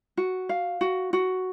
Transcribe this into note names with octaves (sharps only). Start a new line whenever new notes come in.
F#4
F5
F#4
F#4